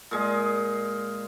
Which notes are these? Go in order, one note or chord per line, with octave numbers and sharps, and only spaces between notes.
A#2 G#3 D#5